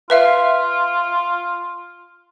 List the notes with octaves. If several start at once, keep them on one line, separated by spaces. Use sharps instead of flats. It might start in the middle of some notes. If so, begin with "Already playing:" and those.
F4 B4 E5 F5